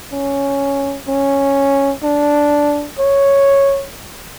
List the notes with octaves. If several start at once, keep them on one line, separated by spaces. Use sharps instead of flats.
C#4
C#4
D4
C#5